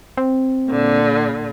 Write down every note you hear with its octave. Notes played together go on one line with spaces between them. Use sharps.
C4
A#2 D3